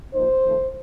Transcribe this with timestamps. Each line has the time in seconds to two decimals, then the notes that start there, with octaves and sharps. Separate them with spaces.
0.14 A#2 F3 A#3 D#4 C5
0.44 F2 D#3 A3